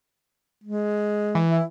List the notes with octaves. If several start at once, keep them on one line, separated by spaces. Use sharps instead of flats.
G#3
E3
E4